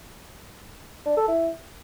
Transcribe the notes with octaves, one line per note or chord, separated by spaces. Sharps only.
D4
A4
E4